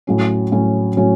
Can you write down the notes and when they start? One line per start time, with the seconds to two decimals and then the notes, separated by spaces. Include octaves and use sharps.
0.07 A2 F#3 C#4
0.52 A2 F#3 C#4
0.97 A2 F#3 C#4